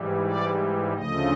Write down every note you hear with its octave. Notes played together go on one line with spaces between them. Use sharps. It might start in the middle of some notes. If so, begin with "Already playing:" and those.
Already playing: G#2 E3 G3
D5
D2 C#3 F3 A3 D#5